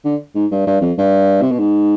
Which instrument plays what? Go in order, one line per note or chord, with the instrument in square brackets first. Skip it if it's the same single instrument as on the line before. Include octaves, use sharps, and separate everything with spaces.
[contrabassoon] D3
G#2
G2
G2
F2
G2
C3
B2
G#2